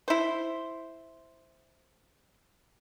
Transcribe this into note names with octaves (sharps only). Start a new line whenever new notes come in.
E4 C5